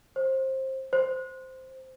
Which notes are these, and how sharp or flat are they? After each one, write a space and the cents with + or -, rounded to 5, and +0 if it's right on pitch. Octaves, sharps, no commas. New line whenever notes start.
C5 +20
C5 -5